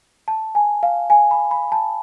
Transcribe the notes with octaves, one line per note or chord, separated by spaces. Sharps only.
A5
G#5
F5
G#5
B5
B5
A5